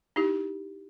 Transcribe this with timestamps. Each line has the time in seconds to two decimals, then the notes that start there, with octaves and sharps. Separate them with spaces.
0.16 D#4 E4 G4